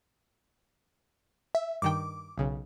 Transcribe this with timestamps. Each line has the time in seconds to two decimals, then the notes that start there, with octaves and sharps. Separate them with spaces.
1.55 E5
1.82 G2 D#3 G5 D6
2.38 B1 C#3